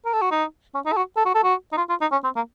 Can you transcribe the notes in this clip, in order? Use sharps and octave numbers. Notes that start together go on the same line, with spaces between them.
A#4
A4
F#4
D#4
C#4
D#4
A4
F#4
A4
F#4
A4
F#4
D#4
F4
F4
D#4
C#4
C4
A#3